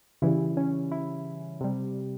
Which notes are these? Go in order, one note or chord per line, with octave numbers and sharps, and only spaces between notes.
C#3 E3 G3 E4
C#4
E4
C3 G3